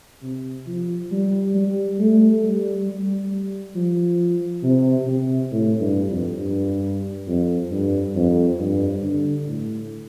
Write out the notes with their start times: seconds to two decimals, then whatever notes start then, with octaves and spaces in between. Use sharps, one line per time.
0.23 C3
0.67 F3
1.12 G3
1.54 G3
1.99 A3
2.43 G3
2.87 G3
3.75 F3
4.63 C3
5.07 C3
5.51 A2
5.80 G2
6.09 F2
6.38 G2
7.27 F2
7.71 G2
8.15 F2
8.59 G2
9.03 D3
9.47 A2